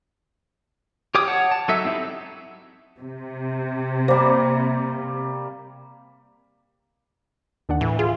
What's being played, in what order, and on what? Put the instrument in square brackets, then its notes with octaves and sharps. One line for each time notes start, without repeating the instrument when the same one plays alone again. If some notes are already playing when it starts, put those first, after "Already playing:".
[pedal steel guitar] G4 C#5 G5 D6 D#6
C#5 F#5 A5
A5
F#3 D#4 A4 E5
C4 D#4 E4 G4
[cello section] C3
[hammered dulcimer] G3 A#3 [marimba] C5
[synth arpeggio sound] D#2 D4 F#5
[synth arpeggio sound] A2 [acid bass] E3
[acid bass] F4 [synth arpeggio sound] G#4